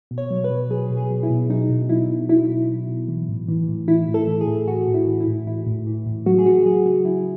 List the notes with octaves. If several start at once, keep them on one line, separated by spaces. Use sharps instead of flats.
B2
C#5
F#3
B4
B2
F#3 G#4
B2
G#4
F#3
E4
B2
F#3 D#4
B2
F#3 E4
B2
F#3 E4
B2
F#3
B2
E3
A2
E3
A2
E3 E4
A2
A4
E3
G#4
A2
E3 F#4
A2
E4
E3
E4
A2
E3 E4
A2
E3
A2
F#3 F#4
G#4
C#3 F#4
F#3 G#4
C#3 F#4
F#3 E4